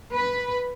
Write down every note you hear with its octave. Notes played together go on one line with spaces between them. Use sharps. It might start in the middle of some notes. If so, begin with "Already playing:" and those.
B4